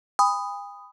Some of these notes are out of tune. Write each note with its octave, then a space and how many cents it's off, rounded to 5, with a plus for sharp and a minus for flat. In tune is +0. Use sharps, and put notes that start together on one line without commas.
G#5 -45 B5 +15 D#6 +0